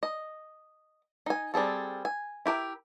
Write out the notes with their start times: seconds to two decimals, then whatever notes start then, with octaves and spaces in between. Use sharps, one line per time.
0.03 D#5
1.26 D#4 G#5
1.54 G3 C4 G#4 A4
2.05 G#5
2.46 E4 G4 A#4 E5